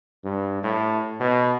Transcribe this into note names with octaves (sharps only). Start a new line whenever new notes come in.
G2
A2
B2